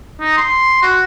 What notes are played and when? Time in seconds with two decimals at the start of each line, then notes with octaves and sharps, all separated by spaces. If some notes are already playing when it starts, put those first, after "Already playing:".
0.20 D#4
0.37 C6
0.82 F#4